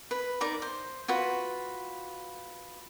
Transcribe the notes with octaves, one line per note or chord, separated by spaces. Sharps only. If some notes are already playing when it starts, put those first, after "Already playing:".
B4
D#4 A#4 D5 A#5
C5
F4 F#4 B4